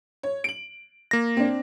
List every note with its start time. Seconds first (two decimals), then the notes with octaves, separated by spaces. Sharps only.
0.23 C#5
0.44 D7 F#7
1.11 A#3 A#6
1.37 C4 D4